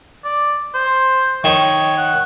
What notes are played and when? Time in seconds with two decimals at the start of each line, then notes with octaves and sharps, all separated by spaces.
0.24 D5
0.74 C5
1.44 D#3 C#5
1.98 F#5